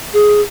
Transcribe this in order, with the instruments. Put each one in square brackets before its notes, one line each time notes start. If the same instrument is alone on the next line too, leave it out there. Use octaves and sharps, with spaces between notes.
[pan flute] G#4